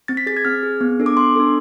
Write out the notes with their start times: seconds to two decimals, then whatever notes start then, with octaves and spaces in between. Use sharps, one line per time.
0.08 C4 A6
0.17 B6
0.26 G#4 A6
0.37 G#6
0.45 C4 F6
0.63 G#4
0.81 B3
1.00 D4 A4
1.06 D6
1.17 B3 C6
1.36 D4 A4